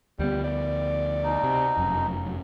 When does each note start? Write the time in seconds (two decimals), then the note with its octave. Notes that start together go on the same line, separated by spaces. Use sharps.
0.19 D2 G3 B3
0.44 G3 D5
1.24 B2 D#4
1.44 C3
1.77 F1 F#2